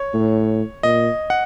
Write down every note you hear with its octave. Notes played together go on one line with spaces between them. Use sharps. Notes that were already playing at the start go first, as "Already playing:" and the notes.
Already playing: C#5
A2
A#2 D#5
F#5